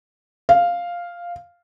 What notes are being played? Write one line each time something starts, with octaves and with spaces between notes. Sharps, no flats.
F5